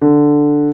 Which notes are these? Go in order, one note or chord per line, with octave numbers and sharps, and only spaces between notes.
D3